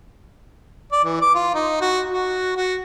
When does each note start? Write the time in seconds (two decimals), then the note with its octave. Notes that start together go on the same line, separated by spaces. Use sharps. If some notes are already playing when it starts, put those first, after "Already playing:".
0.92 D5
1.04 E3
1.21 D6
1.35 F4
1.54 D#4
1.81 F#4
2.09 F#4
2.56 F#4